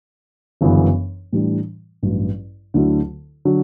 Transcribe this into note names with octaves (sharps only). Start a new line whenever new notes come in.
G1 F#2 C#3 E3 B3
A2 E3 G3 D4
A1 G2 F#3
D2 D3 F#3 A3 E4
D3 F#3